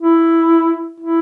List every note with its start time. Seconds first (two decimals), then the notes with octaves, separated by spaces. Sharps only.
0.02 E4
1.00 E4